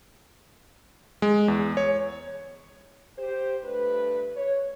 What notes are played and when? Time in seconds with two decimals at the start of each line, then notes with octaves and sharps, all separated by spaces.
1.22 G#3
1.48 E2
1.77 C#5
3.18 G4 C5
3.64 G2 A3 D4 B4
4.37 C#5